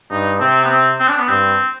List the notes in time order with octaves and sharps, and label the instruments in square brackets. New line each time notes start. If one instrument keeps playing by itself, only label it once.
[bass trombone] G2 [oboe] D#4
[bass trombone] C3 [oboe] C4
[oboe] B3
C4
C4
D4
B3
[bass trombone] G2 [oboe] C4